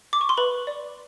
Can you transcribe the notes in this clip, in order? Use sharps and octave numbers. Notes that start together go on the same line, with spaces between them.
D6
C#6
C6
B4 B5
D5